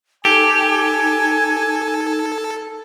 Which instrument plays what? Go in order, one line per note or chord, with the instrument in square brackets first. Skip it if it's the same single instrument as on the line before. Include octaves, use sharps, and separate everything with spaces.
[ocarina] D#4 [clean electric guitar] G4 [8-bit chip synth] A4 [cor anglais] G#5